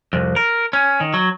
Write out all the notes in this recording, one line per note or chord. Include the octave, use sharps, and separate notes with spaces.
C2 F2
A#4
C#4
D#3
F#3